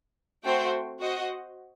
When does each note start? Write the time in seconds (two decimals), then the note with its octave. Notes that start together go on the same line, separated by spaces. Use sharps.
0.44 A3 C4 F#4 C5 G5
1.01 F#4 C5 D#5 F#5